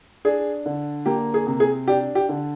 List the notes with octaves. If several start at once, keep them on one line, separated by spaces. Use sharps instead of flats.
D4 G#4
D3
A#3 G4
G#4
C3
G#4
D4 G4
G4
D3